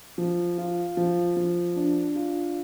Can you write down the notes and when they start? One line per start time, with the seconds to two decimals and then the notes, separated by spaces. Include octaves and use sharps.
0.18 F3
0.58 F4
0.97 F3
1.37 F3
1.76 D4
2.15 F4